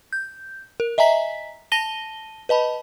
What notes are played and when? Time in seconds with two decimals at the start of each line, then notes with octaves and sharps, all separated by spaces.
0.13 G6
0.80 A#4
0.98 D#5 E5 G#5 A#5 B6
1.72 A5 A#6 D#7 G7
2.49 B4 D#5 A5 B5